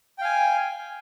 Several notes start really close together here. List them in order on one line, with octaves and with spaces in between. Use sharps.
G5 F5 G#5